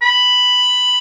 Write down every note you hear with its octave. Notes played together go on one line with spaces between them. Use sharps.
B5